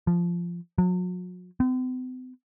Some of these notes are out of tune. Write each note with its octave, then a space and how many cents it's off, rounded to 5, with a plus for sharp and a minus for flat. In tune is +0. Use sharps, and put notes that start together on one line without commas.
F3 -10
F#3 -40
C4 -45